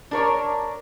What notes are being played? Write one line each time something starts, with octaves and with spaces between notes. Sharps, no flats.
D4 A#4 C#5